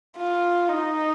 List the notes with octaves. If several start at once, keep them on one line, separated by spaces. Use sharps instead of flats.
F4
D#4